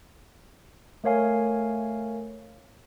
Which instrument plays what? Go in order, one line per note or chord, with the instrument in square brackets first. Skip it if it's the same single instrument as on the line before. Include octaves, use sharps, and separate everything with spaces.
[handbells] A3 A#4 C#5 F5 G#5